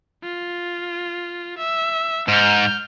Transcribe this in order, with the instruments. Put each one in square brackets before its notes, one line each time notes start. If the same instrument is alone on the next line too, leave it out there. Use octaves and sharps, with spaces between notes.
[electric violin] F4
E5
[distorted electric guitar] G#2 [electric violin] F6 G6